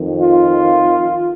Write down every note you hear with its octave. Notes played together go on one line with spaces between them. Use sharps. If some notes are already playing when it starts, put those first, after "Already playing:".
Already playing: F2 D#3
F4